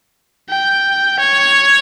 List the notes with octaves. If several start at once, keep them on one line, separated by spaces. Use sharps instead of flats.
G5
C#5